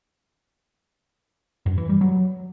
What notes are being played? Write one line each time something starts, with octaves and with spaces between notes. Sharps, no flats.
F#2
E3
G3
F#3